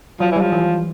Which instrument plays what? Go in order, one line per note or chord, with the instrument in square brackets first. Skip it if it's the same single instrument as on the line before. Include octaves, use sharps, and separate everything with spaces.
[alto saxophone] F3 [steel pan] F#3
[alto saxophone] E3
[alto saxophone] F3 [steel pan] G3
[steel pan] E3